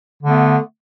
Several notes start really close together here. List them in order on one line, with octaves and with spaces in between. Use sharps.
D3 A3 B3